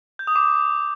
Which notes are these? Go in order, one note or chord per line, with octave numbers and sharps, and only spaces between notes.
G6
D#6
D6